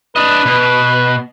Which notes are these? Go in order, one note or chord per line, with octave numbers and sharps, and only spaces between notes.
D4 B4 D#5
B2